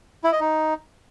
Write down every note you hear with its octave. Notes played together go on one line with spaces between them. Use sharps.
E4
D#5
D#4